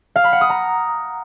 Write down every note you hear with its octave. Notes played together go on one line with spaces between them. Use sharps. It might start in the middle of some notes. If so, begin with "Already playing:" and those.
F5
B5
F#5
D#6
A#5